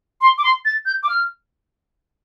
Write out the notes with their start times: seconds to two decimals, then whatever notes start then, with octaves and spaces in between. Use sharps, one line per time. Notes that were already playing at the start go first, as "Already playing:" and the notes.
0.21 C6
0.38 D6
0.43 C6
0.65 A6
0.86 G6
1.03 D6
1.09 F6